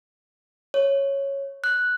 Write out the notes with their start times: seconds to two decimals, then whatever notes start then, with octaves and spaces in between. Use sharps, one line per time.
0.74 C#5
1.64 F#6